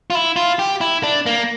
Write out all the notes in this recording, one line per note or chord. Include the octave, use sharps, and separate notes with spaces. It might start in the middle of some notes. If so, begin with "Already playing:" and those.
F4
E4
F4
G4
E4
D4
A#3